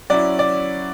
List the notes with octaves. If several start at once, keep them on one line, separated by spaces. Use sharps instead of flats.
F#3 C#4 E4 D5
D5